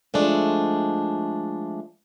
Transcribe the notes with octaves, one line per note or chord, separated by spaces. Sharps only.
F3 G#3 A3 D4